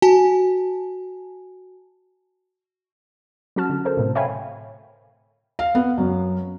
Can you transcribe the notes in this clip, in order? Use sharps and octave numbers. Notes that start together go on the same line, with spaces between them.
F#4 G#5 A5
F#3 C#4 F#4 A5 F6
D3
A4 A#4 C5
A2 C3
C#5 E5 F5 G5 G#5 B5
F5
B3
F#2